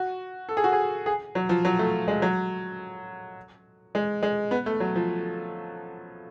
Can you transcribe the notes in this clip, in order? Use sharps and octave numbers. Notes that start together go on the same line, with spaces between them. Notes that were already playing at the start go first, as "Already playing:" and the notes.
Already playing: F#4
A4
G#4
F#4
G#4
G#4
F#3
F3
F#3
A3
G#3
F#3
G#3
G#3
B3
A3
F#3
F3